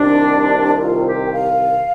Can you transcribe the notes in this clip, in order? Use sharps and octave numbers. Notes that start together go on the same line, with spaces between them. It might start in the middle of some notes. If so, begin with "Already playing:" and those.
Already playing: C2 C3 D#3 D4
F4
G4
G5
F5